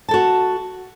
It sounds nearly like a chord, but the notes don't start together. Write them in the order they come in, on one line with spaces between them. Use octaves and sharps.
A5 A4 F#4